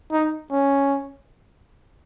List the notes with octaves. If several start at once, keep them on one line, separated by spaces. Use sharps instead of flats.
D#4
C#4